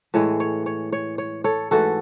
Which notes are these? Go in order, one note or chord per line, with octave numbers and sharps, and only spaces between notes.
A2 E3 G#3 C#5
C#5
C#5
C#5
C#5
A4 C#5
G#2 E3 A3 F#4 A4